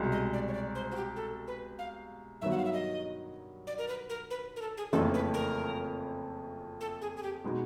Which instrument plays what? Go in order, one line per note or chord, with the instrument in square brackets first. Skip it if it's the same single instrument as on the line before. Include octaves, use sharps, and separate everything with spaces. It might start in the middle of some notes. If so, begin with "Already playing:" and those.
Already playing: [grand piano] C2 B2 G#3
[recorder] D#5
D5
C#5
D5
C5
F#4
G4
A4
B4
F5
[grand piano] G2 D#3 F#3 B3 [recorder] E5
[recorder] F#5
F5
E5
D#5
D5
A#4
B4
A#4
B4
A#4
A4
G#4
[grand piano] F#1 F2 C#3 E3 A3 [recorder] A4
[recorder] B4
A#4
A4
G#4
G#4
G4
[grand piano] B2 G#3 B3 D#4